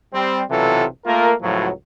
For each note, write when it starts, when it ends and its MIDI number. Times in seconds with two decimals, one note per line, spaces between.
0.13 0.42 55
0.13 0.42 60
0.50 0.84 35
0.50 0.84 48
0.50 0.84 52
0.50 0.84 54
0.50 0.84 65
0.50 0.84 69
1.05 1.32 57
1.05 1.32 58
1.05 1.32 65
1.05 1.32 70
1.41 1.69 37
1.41 1.69 45
1.41 1.69 53
1.41 1.69 54